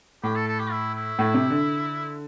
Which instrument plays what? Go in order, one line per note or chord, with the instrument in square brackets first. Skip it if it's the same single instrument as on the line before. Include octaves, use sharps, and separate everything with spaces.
[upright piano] A2 [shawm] G4
[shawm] A4
A4
G4
E4
E4
[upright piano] A2
C3
D3